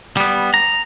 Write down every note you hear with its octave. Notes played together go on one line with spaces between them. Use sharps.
G3 B3
A#5